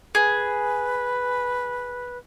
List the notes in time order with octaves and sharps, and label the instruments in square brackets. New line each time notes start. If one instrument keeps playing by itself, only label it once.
[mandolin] G#4 [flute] B4